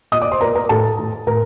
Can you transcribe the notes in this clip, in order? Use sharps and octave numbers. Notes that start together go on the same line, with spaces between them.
A#2 D#5 D#6
D5 D6
C5 C6
A#2 A#4 A#5
A#4 A#5
A2 A4 A5
A2
A2 A#4 A#5